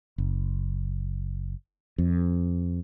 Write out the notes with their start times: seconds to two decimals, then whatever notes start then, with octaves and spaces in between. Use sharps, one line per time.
0.18 F#1
1.98 F2